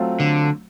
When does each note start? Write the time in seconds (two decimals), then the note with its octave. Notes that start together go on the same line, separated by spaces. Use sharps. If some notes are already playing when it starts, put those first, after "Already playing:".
Already playing: F#3 A3 C4 F4
0.20 D3